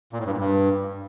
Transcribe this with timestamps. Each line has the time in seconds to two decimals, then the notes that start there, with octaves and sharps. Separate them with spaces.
0.13 A#2
0.19 A2
0.26 G2
0.32 A#2
0.39 G2